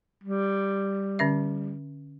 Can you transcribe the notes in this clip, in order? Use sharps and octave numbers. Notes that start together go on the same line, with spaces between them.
G3
D3 C#4 E5